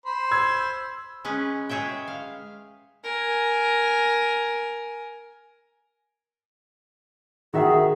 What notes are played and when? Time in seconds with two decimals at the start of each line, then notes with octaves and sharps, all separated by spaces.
0.06 C5 B5 C6
0.31 E6 G#6
1.25 G#3 C#4 B4
1.69 G#3 G#4 C#5 E5 G5
2.08 F5
3.04 A#4 G#5
7.54 D#3 F#4 G#4 E5